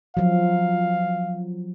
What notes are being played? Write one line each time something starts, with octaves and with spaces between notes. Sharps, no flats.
F3 F#3 F5